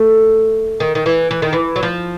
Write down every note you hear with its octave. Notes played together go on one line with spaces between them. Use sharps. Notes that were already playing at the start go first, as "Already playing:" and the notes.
Already playing: A3
D#3
D#3
E3
E3
D#3
E3
F#3
F3